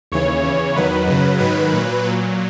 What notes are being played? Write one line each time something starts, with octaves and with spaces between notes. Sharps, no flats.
D#2 C#3 E3 C#5
E2 C#3 E3
E2 D#3 F#3 B4
F#2 C#3 F#3
G#2 D#3 F#3 B4
A#2 F#3
A#2 F#3